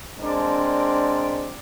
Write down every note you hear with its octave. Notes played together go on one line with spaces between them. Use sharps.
G#3 C4 D4 A#4 D5